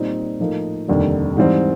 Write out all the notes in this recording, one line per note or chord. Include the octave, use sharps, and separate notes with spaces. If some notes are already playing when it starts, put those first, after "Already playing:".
Already playing: A#2 G3 C4 D#4
A2 F3 A#3 D#4
F1 D#2 D3 G3
G#2 E3 G3 C4